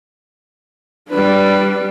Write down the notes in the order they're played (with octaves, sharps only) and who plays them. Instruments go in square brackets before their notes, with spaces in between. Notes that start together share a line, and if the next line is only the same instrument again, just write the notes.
[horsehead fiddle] G3 D4 [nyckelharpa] B4